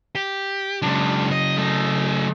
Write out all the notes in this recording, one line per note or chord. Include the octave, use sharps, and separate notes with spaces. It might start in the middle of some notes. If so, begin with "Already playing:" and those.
G4
C#3 F#3 G#3 D4
D#5
A3 D#5